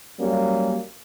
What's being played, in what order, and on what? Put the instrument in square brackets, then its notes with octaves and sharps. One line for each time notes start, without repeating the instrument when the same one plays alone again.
[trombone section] F#3 G3 A#3 C#4